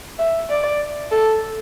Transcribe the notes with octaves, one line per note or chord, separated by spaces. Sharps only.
E5
D5
A4